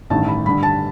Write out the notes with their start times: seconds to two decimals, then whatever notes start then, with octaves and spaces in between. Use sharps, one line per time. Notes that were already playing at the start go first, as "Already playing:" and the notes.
0.10 A1 G2 D#3 A5
0.28 B5
0.46 G2 D3 G3 B5
0.63 A5